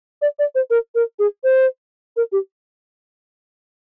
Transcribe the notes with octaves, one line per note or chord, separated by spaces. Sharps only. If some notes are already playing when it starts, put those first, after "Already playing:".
D5
D5
C5
A#4
A#4
G#4
C5
A#4
G4